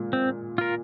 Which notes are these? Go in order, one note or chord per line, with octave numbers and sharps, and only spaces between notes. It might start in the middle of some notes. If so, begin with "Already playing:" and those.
Already playing: A#2 G#3 A#3
C4
F4 A#4